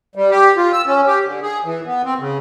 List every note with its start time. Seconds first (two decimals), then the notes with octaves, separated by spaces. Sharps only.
0.16 G3
0.31 G4
0.57 F4
0.73 E6
0.87 C#4
1.07 G4
1.25 D3
1.42 G#4
1.65 E3
1.86 B3
2.05 C4
2.20 C#3